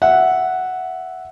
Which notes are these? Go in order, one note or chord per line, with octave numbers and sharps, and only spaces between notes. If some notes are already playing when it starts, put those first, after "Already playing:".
E5 F#5